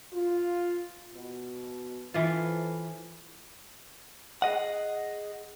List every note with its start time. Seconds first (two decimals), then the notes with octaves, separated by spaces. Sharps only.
0.13 F4
1.14 B2
2.14 E3 F4 A4 B4 C5
4.42 G#4 D#5 F#5